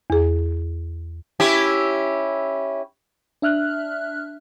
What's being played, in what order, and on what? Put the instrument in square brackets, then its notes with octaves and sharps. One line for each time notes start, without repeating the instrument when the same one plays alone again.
[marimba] E2 G#4
[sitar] C#4 E4 G4
[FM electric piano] D4 E5 F6 F#6